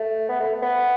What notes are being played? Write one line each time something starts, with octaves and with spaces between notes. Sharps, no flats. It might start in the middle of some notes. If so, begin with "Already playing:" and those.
Already playing: A3
B3
A3
B3